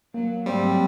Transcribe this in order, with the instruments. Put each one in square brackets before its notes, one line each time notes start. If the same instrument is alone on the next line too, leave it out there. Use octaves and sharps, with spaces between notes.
[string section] F#3 [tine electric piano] A#3
[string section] G#2 F#3 A3 [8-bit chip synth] G3 [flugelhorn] C4